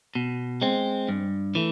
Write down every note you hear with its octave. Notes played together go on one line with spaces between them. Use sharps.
B2
G#3 C4
G2
E3 A3